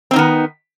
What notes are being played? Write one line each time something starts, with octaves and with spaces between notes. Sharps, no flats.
D#3 B3 C4 D#4